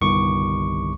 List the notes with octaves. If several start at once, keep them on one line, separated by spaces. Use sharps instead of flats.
G1 C2 D#3 C#6 D6